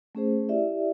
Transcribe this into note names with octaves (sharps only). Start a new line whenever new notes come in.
A3 C#4 G#4 C5
E4 G4 D5 E5